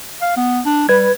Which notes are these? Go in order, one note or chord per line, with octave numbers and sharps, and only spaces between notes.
F5
B3
D4
G3 B4 G#6